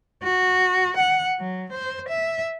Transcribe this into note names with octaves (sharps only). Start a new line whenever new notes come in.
F#4
F#5
F#3
C5
E5